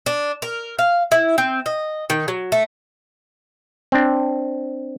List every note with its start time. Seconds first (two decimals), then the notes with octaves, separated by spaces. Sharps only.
0.06 D4
0.42 A#4
0.79 F5
1.12 E4
1.38 C4
1.66 D#5
2.10 D#3
2.28 F#3
2.52 A3
3.92 C4 D4